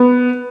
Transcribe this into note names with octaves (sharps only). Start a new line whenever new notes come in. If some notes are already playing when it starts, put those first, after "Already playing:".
Already playing: B3